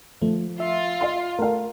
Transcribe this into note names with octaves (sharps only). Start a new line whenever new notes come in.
F3 A3
F4 E5
D#5 F5 C6
A3 A#4 F5